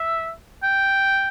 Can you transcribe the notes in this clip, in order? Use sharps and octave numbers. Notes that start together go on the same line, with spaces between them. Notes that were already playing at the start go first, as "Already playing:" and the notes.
Already playing: E5
G5